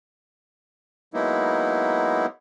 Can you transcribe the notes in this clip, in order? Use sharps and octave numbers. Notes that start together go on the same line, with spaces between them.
F#3 G#3 A#3 B3 D#4 E4